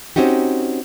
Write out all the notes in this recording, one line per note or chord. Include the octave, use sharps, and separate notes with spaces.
C4 C#4 D#4 F#4 G4